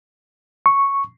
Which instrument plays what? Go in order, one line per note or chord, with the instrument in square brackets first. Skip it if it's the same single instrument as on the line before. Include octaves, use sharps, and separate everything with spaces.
[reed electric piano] C#6